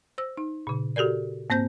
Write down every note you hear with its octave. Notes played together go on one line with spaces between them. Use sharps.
C5 E6
D#4
A#2 C#3
F#4 G4 A4 A#4 D5
G#2 A#3 C4 C5 G6